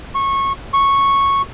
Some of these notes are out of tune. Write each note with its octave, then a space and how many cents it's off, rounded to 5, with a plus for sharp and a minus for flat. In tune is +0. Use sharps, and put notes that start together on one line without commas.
C#6 -20
C#6 -5